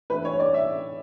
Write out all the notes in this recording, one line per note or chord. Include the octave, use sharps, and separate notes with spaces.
E3 A3 D4 B4
C#5
D5
E5